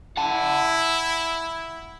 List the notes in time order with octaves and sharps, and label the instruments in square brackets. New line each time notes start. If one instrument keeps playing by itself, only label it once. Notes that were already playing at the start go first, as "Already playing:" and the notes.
[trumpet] E4 [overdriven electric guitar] F#5 A5